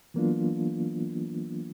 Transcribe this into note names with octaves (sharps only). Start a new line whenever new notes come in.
E3 F#3 A#3 B3 D4 F4